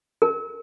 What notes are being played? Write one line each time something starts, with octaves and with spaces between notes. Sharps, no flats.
A#4